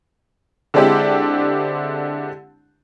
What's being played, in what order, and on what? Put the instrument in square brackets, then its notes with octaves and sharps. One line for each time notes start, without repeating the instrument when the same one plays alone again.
[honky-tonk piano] D3 G#3 C4 D4 E4 G4